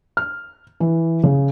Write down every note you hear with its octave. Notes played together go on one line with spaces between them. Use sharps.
F6
E3
C#3